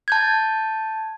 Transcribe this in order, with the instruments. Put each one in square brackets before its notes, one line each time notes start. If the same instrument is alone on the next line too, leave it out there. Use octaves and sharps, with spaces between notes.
[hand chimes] A5 G6 G#6